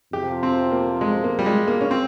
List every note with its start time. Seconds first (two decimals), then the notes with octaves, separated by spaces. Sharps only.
0.13 F2 C3 F3 G4
0.43 C4
0.72 A#3
1.01 G#3
1.24 A#3
1.39 G3
1.46 G#3
1.68 A#3
1.81 C#4
1.91 C4